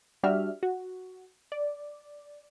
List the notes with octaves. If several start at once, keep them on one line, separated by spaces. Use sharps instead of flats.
G3 D4 F#4 G4 E5 F6
F#4
D5